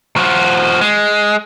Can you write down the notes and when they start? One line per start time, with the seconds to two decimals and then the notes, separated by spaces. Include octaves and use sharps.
0.16 F3 F#4
0.81 G#3